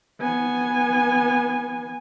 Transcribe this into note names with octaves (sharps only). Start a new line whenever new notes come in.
B3 G#5